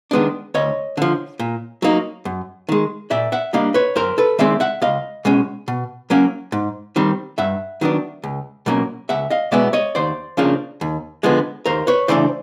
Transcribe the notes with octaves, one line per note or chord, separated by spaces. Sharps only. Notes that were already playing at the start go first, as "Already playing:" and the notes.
D#3 G#3 B3 D4
D2 C#5 D#5
D3 F3
A#2
F#3 A#3 D#4
F#2
D#3 G#3
A#2 D5 E5
E5 F#5
G3 A#3 D4 D#5 F5
B4 C#5
F#2 A#4 C5
A4 B4
D#3 G#3 C4 D5 E5
E5 F#5
C#2 D#5 F5
B2 G#3 C#4
B2
F#3 A#3 C#4
G#2
D#3 G3 C4
G2 E5 F#5
D#3 F#3 B3 D4
C#2
B2 F#3 A#3 C#4
C#2 E5 F#5
D#5 F5
B2 G#3 B3 D5 E5
C#5 D#5
D#2 C5 D5
C#3 F3 A#3 D4
D#2
D3 F3 G#3 B3
D#2 A#4 C5
B4 C#5
C#3 E3 A3 D4 C5 D5